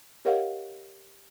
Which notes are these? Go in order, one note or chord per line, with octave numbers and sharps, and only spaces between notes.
G4 A#4 C#5 D#5 F5 F#5